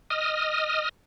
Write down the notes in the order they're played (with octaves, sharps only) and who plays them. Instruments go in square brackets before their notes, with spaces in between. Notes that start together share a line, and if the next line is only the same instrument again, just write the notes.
[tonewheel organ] D#5 D#6 F6